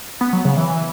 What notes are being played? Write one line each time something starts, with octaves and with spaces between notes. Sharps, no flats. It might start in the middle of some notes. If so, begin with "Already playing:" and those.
B3
F#3
C#3
E3